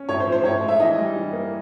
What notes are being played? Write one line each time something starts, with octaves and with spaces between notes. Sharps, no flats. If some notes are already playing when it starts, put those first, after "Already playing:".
Already playing: C#4
A2 C#5
C5
F3
C5
A2 C#5
G#3
E5
E3 D#5
G3
E3
A#3